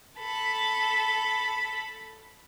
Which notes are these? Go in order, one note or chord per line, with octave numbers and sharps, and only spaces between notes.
A4 B5